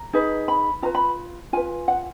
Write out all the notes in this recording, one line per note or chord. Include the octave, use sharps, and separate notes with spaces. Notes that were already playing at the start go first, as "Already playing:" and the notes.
Already playing: A#5
D#4 G#4 B4
B5
F4 B4 A#5
B5
F4 B4 G#5
F#5